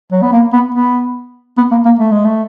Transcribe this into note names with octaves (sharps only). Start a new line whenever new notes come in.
F#3
B3
A#3
B3
B3
B3
A#3
A#3
A3
G#3
A3